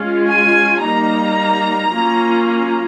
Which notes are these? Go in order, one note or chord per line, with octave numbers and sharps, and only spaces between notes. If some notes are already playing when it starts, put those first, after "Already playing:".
Already playing: G#3 C#4 F4
G#5
G3 A#3 D#4 A#5
F#3 A#3 C#4 F4